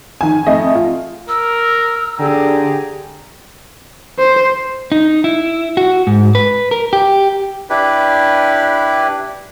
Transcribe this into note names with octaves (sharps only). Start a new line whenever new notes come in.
D#3 G#5
F2 A3 D#5
F4
A#4 E6
D3 G4 G#4 A#5
C5
D#4
E4
F#4
G#2
B4
A#4
G4
D4 E4 G4 B4